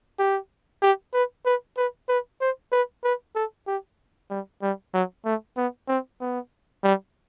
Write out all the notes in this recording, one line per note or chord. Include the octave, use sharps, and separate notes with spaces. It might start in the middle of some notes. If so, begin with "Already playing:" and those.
G4
G4
B4
B4
B4
B4
C5
B4
B4
A4
G4
G3
G3
F#3
A3
B3
C4
B3
G3